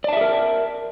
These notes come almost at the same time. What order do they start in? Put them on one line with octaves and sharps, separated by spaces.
D5 A5 E5 G#4 A#4